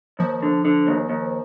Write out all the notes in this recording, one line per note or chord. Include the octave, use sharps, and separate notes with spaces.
D#2 F3
D3
D3
D#2
D#2